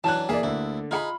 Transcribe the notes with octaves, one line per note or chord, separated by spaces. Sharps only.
E3 F#3 C#4 D4 A5 F#6
E3 A#3 G#4 D5 E5
D2 D3 E4
D#4 F4 G#4 F#5 B5